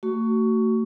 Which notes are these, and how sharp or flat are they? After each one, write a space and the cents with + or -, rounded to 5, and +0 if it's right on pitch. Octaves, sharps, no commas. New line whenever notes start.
A3 +35 F#4 +25 C#6 +15